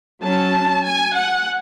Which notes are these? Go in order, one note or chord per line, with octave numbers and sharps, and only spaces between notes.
F#3 C#4 A5
G#5
F#5